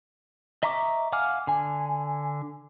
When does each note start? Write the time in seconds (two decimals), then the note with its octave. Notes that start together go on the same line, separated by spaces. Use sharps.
0.63 D#5 E5 A#5 C#6 D6
1.12 F5 F#5 G#5 D6 F6
1.47 D3 G#5